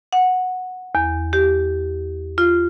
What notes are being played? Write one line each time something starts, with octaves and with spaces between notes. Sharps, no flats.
F#5
E2
G4
F4